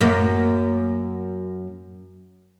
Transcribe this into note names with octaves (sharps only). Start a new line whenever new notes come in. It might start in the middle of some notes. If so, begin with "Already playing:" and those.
F#2 A#3